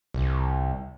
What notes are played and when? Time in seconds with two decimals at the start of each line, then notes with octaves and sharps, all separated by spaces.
0.14 C2